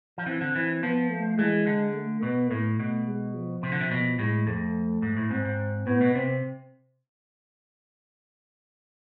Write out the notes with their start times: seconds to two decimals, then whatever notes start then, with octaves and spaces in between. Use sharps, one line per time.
0.18 F3
0.26 E3 C4
0.41 D3
0.55 E3
0.82 F3 B3
1.11 A3
1.38 E3 G#3
1.67 D3
1.95 A3
2.22 B2 B3
2.50 A2 A3
2.79 B2
3.07 G#3
3.34 F3
3.63 C3
3.72 D3
3.81 C3
3.91 B2
4.19 A2 G#3
4.47 F2 A3
5.02 G#2
5.17 A2
5.30 G#2 C4
5.45 G#2
5.86 A2 B3
6.01 B2
6.15 C3 C4